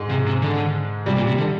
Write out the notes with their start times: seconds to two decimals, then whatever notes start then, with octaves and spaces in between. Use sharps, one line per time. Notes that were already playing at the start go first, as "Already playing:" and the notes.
Already playing: G#2 G#3
0.09 C3
0.26 C3
0.42 D3
1.06 C3 G3
1.16 A#2
1.27 C3
1.38 D3